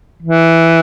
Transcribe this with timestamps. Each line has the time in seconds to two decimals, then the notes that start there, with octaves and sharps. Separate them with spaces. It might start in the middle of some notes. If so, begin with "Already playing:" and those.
0.23 E3